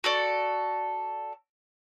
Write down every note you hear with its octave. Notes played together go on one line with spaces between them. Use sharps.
F#4 A4 D5